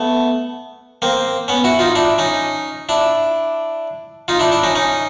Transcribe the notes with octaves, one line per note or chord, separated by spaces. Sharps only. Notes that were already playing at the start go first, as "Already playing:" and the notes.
Already playing: A3 B3
A#3 C4
B3 C#4
E4 F#4
D#4 F4
D4 E4
C#4 D#4
D4 E4
D#4 F4
D4 E4
D4 E4
C#4 D#4
C#4 D#4